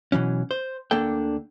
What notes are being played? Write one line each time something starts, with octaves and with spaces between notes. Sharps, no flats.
B2 E3 F#3 C#4
C5
D2 D3 A#3 D4 A4 G5